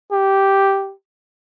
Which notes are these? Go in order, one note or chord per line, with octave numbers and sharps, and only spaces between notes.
G4